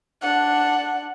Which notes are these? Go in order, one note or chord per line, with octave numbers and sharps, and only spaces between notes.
D4 F#5